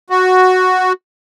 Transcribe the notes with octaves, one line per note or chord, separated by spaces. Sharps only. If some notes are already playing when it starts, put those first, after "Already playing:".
F#4